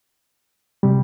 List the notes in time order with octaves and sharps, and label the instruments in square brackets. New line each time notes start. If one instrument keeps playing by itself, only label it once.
[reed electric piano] C3 G3